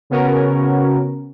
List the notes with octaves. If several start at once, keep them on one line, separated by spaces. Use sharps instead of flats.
C#3 B3 C#4 F#4 A#4